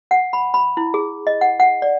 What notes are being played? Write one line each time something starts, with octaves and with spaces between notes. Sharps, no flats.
F#5
B5
B5
E4
G#4
D#5
F#5
F#5
D5